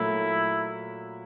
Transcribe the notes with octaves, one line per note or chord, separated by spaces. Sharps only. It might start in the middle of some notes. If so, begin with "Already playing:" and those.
Already playing: A#2 F#3 A3 E4